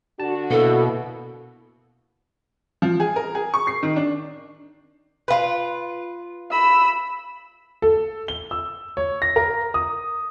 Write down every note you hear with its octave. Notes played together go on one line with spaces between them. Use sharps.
D3 D4 F#4 A5
B2 A#3 B3 E4 A4
F3
G#4
A#4
G#4
C#6
C7
D#3
D4
F4 B4
B5 E6
A4
G7
E6
C#5
A#6
A#4
D#6